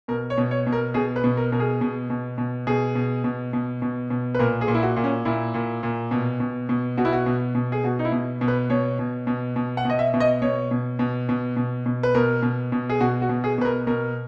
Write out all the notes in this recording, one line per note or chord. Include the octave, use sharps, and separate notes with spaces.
B2 A#4
C#5
B2
C#5
B2
A#4
B2 G#4
B4
B2
A#4
B2 A#4
G#4
B2
B2
B2
B2 G#4
B2
B2
B2
B2
B2
B4
A#2 A#4
G#4
A#2
E4
F#4
A#2
C#4
A#2 E4
A#2
A#2
B2
B2
B2
B2 F#4
E4
F#4
B2
B2
G#4
B2 F#4
D#4
E4
B2
B2
B4
B2 C#5
B2
B2
B2
F#5
B2 D#5
E5
B2
D#5
B2 C#5
B2
B2
B2
B2
B2
B4
B2 A#4
B2
B2
G#4
B2 F#4
F#4
B2
G#4
B2 B4
A#4
B2 A#4